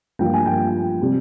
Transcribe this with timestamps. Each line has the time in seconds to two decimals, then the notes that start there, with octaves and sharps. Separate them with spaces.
0.19 G2 F3 A#3 F4 G5
0.34 G#5
0.46 G5
1.02 C3 G3